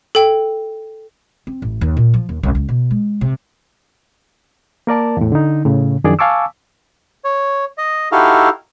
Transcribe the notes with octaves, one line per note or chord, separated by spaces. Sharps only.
A4 G5
C4
A1
D#2
A#2
F3
D#2
C2
C#2
B2
G#3
C3
A#3 A#4 D5 A5
E2 A2
D3 D#4
A2 C#3
F#2 D#3 F3 D4 G#4 D5
F5 G#5 A5 C#6 D6 E6
C#5
D#5
D#4 E4 F#4 G4 A4 F5